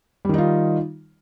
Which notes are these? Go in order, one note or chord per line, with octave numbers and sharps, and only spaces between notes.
D#3 G3 D#4 F4